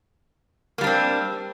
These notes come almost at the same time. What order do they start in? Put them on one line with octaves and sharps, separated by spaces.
A#3 G3 D4 C4